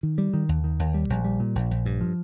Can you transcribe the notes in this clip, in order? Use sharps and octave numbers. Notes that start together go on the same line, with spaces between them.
D#3
G3
D#3
D#2
D#3
D#2
G3
A#1
G3
A#2
A#1
A#1
G2
F3